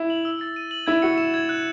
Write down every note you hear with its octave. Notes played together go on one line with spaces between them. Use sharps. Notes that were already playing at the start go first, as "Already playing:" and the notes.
Already playing: E4
F#7
E6
A6
D#7
F#7
E4 G#6
F#4 C#7
E7
G#6
F#6